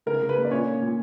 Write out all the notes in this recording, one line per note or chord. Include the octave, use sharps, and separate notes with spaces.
C#3 A#4
C#3
B4
A#3
D5
A#2 C#4 C#5
A#3
A#2